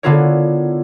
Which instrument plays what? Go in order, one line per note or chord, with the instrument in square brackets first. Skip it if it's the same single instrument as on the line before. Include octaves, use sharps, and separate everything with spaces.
[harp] D3 B3 E4 F4 A#4 C#5